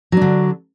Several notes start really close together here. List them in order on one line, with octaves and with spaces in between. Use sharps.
F#3 D4 D3